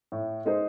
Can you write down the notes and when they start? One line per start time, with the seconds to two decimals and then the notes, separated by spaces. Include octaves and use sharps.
0.12 A2
0.45 G#3 D#4 G#4 C5